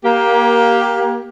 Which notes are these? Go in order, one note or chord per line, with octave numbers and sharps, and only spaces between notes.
A#3 G4